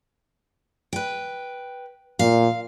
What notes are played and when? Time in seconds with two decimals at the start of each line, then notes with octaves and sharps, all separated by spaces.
0.93 B4 G5
2.19 A#2 F5